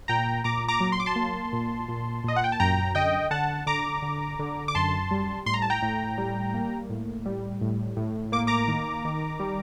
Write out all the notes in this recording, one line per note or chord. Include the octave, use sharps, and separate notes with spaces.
A#2 G5 A#5
A#2 A#5 D6
A#5 D6
F#3
C6
D6
A5 C6
A#3
A#2
A#2
A#2 D#5
F#5
G5
A5
F#2 G5 A#5
D3 D#5 G5
D3 F#5 A5
D3 A#5 D6
D3
D3
D6
F#2 A5 C6
G3
A2 C6
A#5
A5
G5 A#5
A2
G3
A#3
A2
G3
A2
A2
A#3 D6
A#5 D6
D#3
D#3
G3